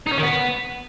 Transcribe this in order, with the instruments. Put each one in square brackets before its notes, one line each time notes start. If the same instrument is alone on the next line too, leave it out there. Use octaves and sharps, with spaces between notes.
[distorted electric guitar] D#4
C#4
D#3
B3